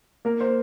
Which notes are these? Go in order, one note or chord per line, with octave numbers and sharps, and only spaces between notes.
A#3 A#4
C5